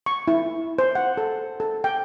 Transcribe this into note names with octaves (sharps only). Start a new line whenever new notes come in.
C#6
E4
C5
F#5
A4
A4
G5